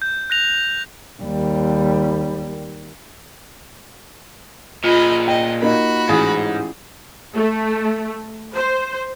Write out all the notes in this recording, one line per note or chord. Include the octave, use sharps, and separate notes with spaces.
G6
F#6 A#6 F7
D#2 G3
A#2 F4 G#4 D#5 B5
D#5 G5
A#3 D#4 F#4 B5
A1 G#2 G#4 G#5
A3
C5